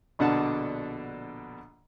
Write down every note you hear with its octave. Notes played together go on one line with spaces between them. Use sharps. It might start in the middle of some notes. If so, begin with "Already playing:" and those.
A#1 B2 D3 D4 F#5 A5